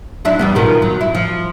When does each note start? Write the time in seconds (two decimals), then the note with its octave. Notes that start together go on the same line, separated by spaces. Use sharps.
0.25 F#3 D4 E4
0.39 E2 G3 B3
0.55 B2 D#3 F3
0.82 F#3
1.01 E4
1.15 F3